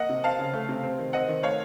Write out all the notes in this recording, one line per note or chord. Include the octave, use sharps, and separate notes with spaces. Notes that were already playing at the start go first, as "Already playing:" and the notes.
Already playing: A#3 D#5 F#5
C3
C4 F5 A5
C#3
A3
C3
C4
D#3
C4 D#5 F#5
D#3
A3 C#5 F5